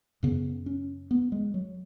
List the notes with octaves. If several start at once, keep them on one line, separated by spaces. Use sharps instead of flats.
F#2 C#3 B3
C#4
B3
G#3
F#3